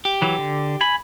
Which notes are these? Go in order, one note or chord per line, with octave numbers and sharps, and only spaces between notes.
G4
E3 F#3
D3
G#5 B5